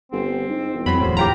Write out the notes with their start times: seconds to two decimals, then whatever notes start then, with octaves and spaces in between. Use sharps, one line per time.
0.12 G1 C4
0.48 G#2
0.73 E1
0.86 F2 F#3 C4 B5
1.00 D1 E2 A2 F#3 C5
1.17 F4 G4 G5 A#5